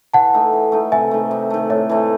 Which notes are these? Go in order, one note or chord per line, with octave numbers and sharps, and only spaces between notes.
E3 F#5 A5
A3 D#4
E3
A3 D#4
C3 E5 G#5
D#3 A3
C3
D#3 A3
A2 C#5 E5
E3 A3 D#4